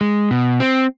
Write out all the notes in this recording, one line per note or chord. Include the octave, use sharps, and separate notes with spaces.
G#3
B2
C4